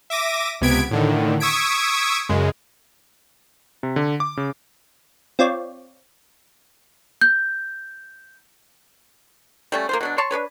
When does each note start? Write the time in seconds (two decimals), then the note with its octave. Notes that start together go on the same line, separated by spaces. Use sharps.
0.10 E5 D6 A#6 D#7
0.61 C#2 C3 B3 G#6 B6 D7
0.91 A2 D3 D#3
1.40 C#6 D#6 E6 G#6 B6 D7
2.29 F#2 C#3 G#3
3.83 C3
3.96 D3
4.20 D6
4.37 C#3
5.39 C4 F4 C#5 D5
7.21 G6
9.72 G3 A3 C#4
9.89 A#3 F4 C5
10.01 B2 F#3 D4
10.18 C#5 A5 C6 C#6
10.31 D4 A4 B4 C#5